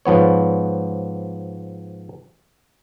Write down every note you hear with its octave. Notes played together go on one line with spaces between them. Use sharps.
G#2 F3 B3 C#5